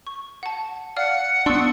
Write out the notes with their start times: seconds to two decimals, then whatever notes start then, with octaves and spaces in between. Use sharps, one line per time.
0.07 C#6
0.43 F#5 A5
0.97 D5 F5 F#5 F6
1.46 B3 D4 C6 C#6 E6